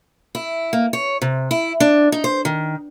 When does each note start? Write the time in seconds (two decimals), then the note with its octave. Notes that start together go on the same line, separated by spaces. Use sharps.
0.35 E4
0.73 A#3
0.93 C#5
1.22 C3
1.51 E4
1.80 D4
2.12 D#4
2.24 C5
2.45 D#3